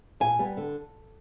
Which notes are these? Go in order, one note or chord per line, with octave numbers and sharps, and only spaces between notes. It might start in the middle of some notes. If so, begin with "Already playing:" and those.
A#2 G#5
G3 B3
D3